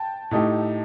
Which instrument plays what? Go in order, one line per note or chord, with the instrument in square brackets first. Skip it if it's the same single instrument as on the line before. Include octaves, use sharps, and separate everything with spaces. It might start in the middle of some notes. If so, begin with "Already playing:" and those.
Already playing: [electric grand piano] G5 A5
[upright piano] A2 A3 D#4 G4